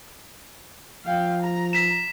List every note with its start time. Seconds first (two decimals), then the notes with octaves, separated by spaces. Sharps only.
1.05 F3 F5 G5
1.42 A#5
1.73 B6 E7